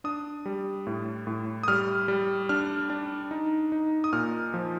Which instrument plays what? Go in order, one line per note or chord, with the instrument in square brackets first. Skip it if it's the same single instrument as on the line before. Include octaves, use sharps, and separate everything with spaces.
[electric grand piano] D4 D#6
G3
A2
A2
D#6
G3 F6
G3
D4 F6
D4
D#4
D#4
D#6
A#2 F6
F3